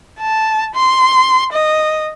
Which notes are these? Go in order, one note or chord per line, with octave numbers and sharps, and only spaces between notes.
A5
C6
D#5